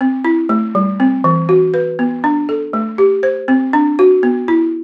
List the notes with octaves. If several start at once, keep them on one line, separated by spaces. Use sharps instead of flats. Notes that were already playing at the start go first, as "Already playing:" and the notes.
C4
E4
A3
G3
C4
E3
F#4
B4
B3
D4
A4
A3
G4
C5
C4
D4
F#4
B3
E4